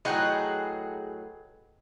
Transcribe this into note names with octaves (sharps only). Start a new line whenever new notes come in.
A2 F#3 G#4 B4 D#5 F#5 G5 A#5